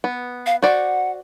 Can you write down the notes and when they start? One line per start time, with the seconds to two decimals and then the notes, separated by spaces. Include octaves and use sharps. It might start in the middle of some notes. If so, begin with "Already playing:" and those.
0.04 B3
0.46 F5
0.63 F#4 C5 D5 F#5